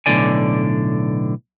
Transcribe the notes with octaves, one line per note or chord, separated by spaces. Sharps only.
B1 A2 D3 D5 G#5